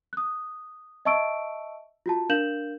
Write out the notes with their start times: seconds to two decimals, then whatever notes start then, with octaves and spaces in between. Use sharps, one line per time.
0.13 D#6 F#6
1.05 D#5 E5 A5 C#6 E6 D7
2.06 F4 F#4 A5
2.29 D4 A#4 F5 G6 E7 F#7